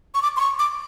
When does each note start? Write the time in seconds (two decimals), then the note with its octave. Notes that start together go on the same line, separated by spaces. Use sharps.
0.15 C#6
0.23 D6
0.37 C6
0.40 C#6
0.59 D6